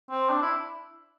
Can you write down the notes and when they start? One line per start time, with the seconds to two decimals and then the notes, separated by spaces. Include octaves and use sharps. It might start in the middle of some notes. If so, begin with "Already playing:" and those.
0.10 C4
0.29 D4
0.42 E4